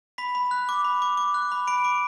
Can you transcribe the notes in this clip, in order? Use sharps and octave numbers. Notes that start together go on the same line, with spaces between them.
B5 B6
B5
F#6
D6
B5
D6
D6
F#6
B5
B5 D7
D6